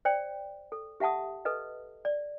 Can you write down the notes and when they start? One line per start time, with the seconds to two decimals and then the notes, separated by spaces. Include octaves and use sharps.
0.05 C5 D5 G5
0.72 A4
1.00 G4 E5 F#5 A5 D#6
1.45 A4 B4 D#5
2.05 D5